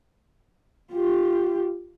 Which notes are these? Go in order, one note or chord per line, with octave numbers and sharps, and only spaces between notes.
F4 G4